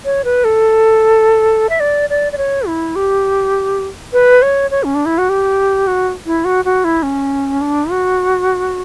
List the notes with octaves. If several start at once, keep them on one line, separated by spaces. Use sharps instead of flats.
C#5
B4
A4
E5
D5
D5
D5
C#5
E4
G4
B4
C#5
C#5
C#4
D4
E4
F#4
G4
F#4
E4
F#4
F#4
E4
C#4
D4
F#4